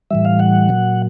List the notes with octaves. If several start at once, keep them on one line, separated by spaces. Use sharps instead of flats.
A2 E3 G3 E5
F5
F#5
A#2 F#3